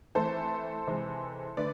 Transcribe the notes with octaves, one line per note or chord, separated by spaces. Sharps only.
E3 A3 C4 A4 C5
C3 E3 G#3 C4
D3 A3 B4 D5